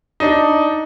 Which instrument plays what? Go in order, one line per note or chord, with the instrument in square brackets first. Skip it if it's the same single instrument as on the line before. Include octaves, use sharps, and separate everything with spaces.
[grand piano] D4 D#4